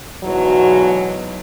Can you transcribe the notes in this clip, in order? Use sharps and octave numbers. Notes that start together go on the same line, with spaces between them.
E2 G#2 B2 F#3